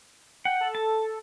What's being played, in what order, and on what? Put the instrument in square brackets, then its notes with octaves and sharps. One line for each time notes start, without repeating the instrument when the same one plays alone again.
[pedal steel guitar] F#5 [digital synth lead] G5
[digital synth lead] A4
[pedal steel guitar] A5